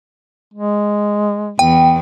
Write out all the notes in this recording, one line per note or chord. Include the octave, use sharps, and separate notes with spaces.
G#3
E2 G5